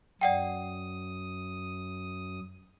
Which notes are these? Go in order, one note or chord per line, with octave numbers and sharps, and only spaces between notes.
F#2 D5 F#5 G5 D#6